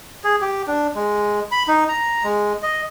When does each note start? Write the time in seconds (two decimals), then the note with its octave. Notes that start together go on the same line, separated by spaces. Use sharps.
0.24 G#4
0.41 G4
0.67 D4
0.95 G#3
1.51 B5
1.68 D#4
1.88 A#5
2.24 G#3
2.63 D#5